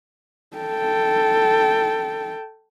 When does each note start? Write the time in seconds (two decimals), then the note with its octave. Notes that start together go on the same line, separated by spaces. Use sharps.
0.57 A4 G5